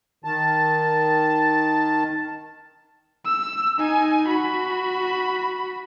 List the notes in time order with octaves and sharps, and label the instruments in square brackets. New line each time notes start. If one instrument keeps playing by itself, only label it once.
[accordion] D#3 A5
[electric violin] E6
D#4 G#5
F#4 B5